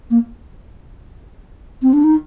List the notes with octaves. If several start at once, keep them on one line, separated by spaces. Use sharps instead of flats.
A#3
C4
D4
D#4